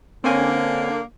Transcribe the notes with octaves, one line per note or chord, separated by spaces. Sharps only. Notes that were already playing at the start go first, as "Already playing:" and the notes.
D3 A#3 C4 C#4 G#5